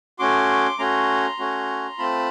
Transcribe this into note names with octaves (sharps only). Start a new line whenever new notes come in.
A3 C#4 F#4 C6 D6
A3 C#4 F#4 A#5 C6
A3 C#4 F#4
A3 C4 F4 A5 B5